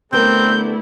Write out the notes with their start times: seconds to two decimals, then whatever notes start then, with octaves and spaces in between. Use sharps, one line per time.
0.13 D3 G3 A3 B3 C4 E4 A#4 G6